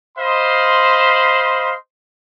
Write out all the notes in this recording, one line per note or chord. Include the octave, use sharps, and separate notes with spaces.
C5 D#5 F5 B5 C6